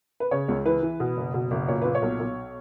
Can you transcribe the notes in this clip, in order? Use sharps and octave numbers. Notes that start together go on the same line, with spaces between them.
B4
C#3 C#5
C#2
E3 B4
E3
B2
F#1
B2
F#1
A#2 C#5
A#2 B4
C#5
B1
B1